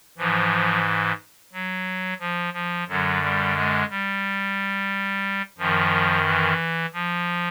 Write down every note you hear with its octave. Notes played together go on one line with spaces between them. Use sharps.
G#2 E3 F3
F#3
F3
F3
F#2 D3 F#3
G3
G#3
G3
F#2 D#3 F3
E3
F3